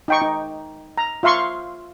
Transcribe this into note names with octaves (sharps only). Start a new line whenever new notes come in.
D#4 G5 C#6
D#4
A#5
F4 E5 F5 C6 C#6